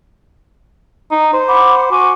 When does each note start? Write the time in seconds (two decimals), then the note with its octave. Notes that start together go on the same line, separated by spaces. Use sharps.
1.11 D#4
1.33 C5
1.48 F#5 B5 D6
1.91 F#4 G#5 D6